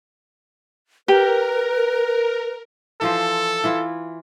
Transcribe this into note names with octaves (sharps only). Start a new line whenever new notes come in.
G4 A#4 B4
E3 F3 A4 C5
E3 E4 F4